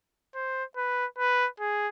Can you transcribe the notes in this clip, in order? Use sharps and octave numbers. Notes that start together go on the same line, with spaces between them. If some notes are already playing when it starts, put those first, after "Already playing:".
C5
B4
B4
G#4